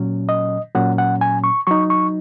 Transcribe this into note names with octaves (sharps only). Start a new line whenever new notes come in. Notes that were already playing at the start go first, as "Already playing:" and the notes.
Already playing: A#2 F#3 C#4
D#5
A#2 F#3 C#4 F#5
F#5
G#5
C#6
F#3 D#4 C#6
C#6